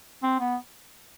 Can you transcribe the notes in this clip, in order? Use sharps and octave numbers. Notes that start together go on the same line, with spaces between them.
C4
B3